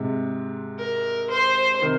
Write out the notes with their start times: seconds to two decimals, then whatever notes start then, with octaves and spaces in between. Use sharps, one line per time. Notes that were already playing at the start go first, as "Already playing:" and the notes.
Already playing: G#2 C3
0.79 A#4
1.30 C5
1.82 C3 D#3